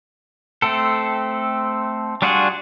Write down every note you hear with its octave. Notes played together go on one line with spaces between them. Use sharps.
A3 C4 A4
G3 D4 F4 F#4 G#4